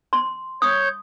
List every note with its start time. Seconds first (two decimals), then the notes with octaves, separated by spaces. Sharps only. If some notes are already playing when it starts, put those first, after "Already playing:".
0.13 C6
0.62 C#5 D#6 G6